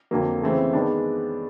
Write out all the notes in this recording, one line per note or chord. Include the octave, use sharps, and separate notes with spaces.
F2 D3 F#3 A#3
C#3 E3 A3 C4
D#3 G#3 B3 D4